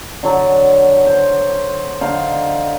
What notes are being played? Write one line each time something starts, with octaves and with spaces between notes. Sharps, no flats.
D3 F#3
C5
D3 D#4 F5